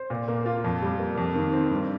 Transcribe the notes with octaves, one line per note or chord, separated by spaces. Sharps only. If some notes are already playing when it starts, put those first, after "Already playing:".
Already playing: C5
A#2
A#3
F4
F2
G3
A#3
F2
D#3
C4
G2